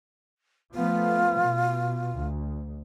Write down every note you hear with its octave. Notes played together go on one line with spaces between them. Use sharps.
F3 A3 B3 F4
B2
D2